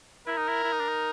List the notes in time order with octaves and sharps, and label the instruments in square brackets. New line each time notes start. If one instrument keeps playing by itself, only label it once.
[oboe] E4 [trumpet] A#4
[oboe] D#4
E4
E4
D#4
D4
D#4